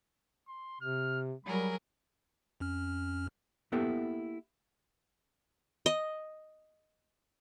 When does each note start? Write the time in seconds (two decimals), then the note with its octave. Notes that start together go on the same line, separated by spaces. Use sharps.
0.48 C6
0.81 C3 F6
1.45 F#3 G3 G#4 A#4 B5
2.60 F2 C#4 F6
3.72 A#3 B3 E4 G4 A4 F#5
5.86 D#5